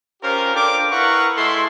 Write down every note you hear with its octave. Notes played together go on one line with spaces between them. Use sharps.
C#4 F4 G4 A#4 C5
D4 F4 A4 A#4 G5 D6
E4 A#4 B4 F5 F#5 C#6
G#3 E4 A4 E5 C6